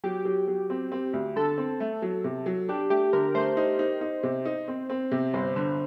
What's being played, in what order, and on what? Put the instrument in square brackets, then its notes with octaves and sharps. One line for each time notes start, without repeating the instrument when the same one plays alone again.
[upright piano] F#3 [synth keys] G4
[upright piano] F#3
F#3
C4
C4
D2
[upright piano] D3 [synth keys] A4
[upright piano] C4
A3
F#3
C3
F#3
[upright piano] D4 [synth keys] G4
[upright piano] A3 [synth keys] G4
[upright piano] D3 [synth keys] A#4
[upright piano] A3 [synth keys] C5
[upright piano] D#4
D#4
D#4
C3
D#4
C4
C4
C3
[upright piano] G1 [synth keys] C5
[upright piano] D3